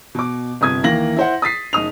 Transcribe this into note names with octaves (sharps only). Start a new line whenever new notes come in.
B2 D6
G1 C3 D#6 G#6
D#2 E3 A#3 A#6 F#7
E4 C5 F#5
D#6 A6 B6 C7
F#1 D#4 D#6 F7